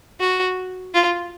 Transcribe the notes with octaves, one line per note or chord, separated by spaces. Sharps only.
F#4
F4